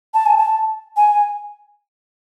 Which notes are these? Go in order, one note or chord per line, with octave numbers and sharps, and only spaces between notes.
A5
G#5
A5
G#5